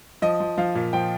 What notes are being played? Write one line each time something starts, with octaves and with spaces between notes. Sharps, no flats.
F3 D#5
F3
F3 F5
A#2
F3 G5